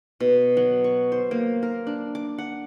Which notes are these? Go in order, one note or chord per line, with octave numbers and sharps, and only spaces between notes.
B2
F#3
C#6
C5
A#3
A#4
D4
D6
F#5